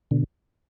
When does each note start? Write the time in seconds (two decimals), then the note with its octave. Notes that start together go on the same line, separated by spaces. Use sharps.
0.11 B2 D3